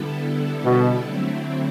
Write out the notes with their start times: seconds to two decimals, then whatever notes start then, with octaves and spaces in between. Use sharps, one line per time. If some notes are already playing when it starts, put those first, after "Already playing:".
Already playing: D3 G3 B3 E4 A4
0.65 B2
1.07 D3 F#3 A3 C4 E4